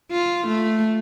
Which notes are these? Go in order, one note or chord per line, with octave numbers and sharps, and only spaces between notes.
F4
A3